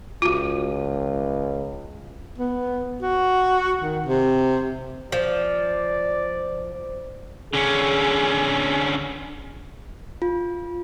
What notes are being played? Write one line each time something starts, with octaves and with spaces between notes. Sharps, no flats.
C#2 F4 F#4
B3
F#4
D#3
C3
F3 D5
D3 C#4 G#4
F4